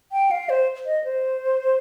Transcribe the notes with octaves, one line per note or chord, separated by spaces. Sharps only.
G5
F5
C5
D#5
C5